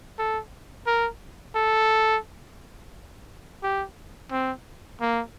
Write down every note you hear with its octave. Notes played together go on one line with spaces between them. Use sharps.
A4
A#4
A4
G4
C4
A#3